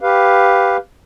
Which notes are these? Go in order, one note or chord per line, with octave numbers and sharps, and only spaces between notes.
G4 B4 F5